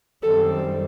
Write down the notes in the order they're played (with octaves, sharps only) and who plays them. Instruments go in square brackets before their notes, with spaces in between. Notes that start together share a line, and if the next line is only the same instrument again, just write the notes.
[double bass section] F#2 D#3 G3 C4 [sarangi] A4